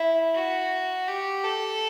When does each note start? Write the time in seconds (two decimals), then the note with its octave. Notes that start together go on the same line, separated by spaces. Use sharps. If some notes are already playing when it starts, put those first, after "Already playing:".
Already playing: E4
0.36 F#4
1.08 G4
1.44 A4